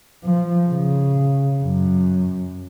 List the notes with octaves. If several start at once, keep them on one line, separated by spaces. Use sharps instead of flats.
F3
C#3
F#2